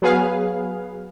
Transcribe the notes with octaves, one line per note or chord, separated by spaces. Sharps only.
F#3 B3 G#4 B4 F5